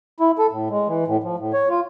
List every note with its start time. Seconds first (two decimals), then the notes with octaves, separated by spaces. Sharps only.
0.20 E4
0.38 A4
0.52 A2
0.70 G#3
0.88 E3
1.08 A2
1.23 F3
1.39 A2
1.53 C#5
1.70 F4